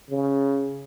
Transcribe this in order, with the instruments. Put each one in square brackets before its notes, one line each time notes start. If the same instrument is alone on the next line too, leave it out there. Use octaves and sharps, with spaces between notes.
[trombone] C#3